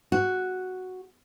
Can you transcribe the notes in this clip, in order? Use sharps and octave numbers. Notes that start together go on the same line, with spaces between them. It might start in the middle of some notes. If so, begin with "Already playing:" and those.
F#4